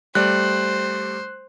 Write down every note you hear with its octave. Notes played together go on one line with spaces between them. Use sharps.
G3 A3 C5 D5 F#6